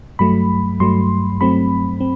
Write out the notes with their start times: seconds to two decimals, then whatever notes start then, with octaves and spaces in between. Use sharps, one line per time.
0.19 G2 F#3 A3 B5
0.80 G2 F#3 A3 C6
1.41 G2 F#3 A3 C4 B5
2.01 C4